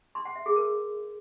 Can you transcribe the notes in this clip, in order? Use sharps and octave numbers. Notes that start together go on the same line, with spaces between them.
C6
F#5
E5
G#4
A#4